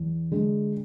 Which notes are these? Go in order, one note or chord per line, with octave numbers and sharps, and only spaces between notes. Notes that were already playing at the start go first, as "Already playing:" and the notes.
Already playing: E2
D3 G#3 D4